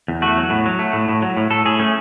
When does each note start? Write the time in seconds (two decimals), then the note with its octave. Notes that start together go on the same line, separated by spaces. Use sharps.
0.08 E2
0.22 A3 F#4
0.37 F#3
0.50 A2
0.66 F#3
0.79 A3
0.93 A2
1.09 A2
1.22 F#3
1.37 A2
1.50 A2 A4
1.65 A2 G#4
1.80 A3 C#4